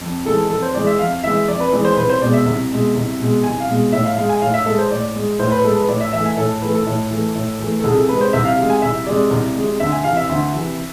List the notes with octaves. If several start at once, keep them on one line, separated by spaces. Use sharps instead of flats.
F2
E3 G#3 A4
F2 A4
C5
E3 G#3 D5
E5
F2 F5
E3 G#3 E5
F2 D5
B4
E3 G#3 D5
C5
C2 B4
C5
B2 G#3 D5
E5
C2
B2 G#3
C2
B2 G#3
C2 G#5
F5
B2 G#3
A2 E5
F5
G#3 F5
G#5
A2 F5
E5
G#3 A4
C5
A2 D5
G#3
A2 C5
B4
G#3 A4
B4
A2 D5
E5
E3 A3 E5
G#5
A2 A4
E3 A3 B4
A4
A2
E3 A3
A2
E3 A3
A4
C2 G#4
A4
C3 G#3 B4
C5
C2 E5
F5
C3 G#3 F5
G#5
C2 E5
C3 G#3 D5
C2
C3 G#3
D2 E5
G#5
C3 E3 F5
E5
D2
C3 E3